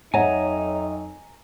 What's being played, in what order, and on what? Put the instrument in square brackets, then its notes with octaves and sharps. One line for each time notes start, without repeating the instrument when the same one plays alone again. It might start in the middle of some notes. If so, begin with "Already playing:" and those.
[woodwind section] F2 F#3 [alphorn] D#4 [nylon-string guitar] C#5 E5 F#5 [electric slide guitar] G#5 A#5